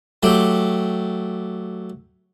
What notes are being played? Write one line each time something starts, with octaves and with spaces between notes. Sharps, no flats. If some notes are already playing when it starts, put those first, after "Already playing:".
F#3 A3 G4